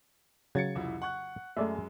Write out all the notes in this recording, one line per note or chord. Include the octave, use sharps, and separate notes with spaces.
C#3 F#3 G#6 A6 C#7
C2 F2 E4
F#5 C#6 F#6
F#2 G#3 A3 D5 E5